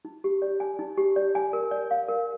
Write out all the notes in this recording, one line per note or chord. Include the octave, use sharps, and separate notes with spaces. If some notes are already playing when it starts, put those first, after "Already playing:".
D#4
G4
D5
G#5
D#4
G4
D5
G#5
A#4
D5
F5
A#4